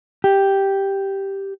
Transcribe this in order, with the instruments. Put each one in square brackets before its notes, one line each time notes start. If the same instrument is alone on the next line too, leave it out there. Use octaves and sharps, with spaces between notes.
[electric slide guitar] G4